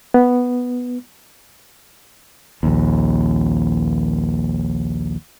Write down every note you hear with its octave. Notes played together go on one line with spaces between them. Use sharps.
B3
A#1 D#2